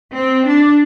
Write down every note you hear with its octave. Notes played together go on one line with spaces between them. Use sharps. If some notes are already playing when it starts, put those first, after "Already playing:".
C4
D4